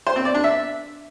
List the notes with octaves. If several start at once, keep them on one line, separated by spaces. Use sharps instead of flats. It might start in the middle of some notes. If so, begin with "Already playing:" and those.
C5
C4
D5
D4
E5